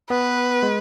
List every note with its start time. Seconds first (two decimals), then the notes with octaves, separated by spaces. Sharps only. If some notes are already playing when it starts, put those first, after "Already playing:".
0.10 B3 B4
0.63 G#3